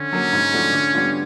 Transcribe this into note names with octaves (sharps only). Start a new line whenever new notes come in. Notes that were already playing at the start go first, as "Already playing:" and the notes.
Already playing: D3 C#4
F#3 A#3
G#2
F3 A3 D4 F#4
D3
G3 B3 D4 F4